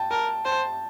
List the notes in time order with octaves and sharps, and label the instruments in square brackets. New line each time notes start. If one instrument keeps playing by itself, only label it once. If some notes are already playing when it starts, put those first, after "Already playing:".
Already playing: [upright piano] G5 A5
[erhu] A#4 [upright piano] A5
[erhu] C5 [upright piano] A5